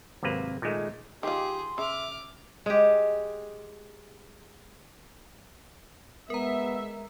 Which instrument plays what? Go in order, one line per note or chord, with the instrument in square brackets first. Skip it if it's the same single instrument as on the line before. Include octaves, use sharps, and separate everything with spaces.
[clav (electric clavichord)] G#1 C3 F#3 A#3 B4
A#2 D#3 G#3 A3
[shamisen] D#3 F4 [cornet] G4 [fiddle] G#4 [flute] C6
[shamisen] C#3 [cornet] E5 [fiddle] D6 F6
[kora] G#3 G4
[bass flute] G#3 [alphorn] B3 [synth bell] A#4 A#5 [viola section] E5